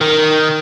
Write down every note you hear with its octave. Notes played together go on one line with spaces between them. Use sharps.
D#3